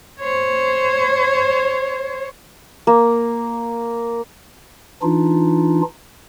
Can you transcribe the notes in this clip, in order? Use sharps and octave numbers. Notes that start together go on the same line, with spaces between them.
C5 C#5
A#3
E3 D4 D#4 F4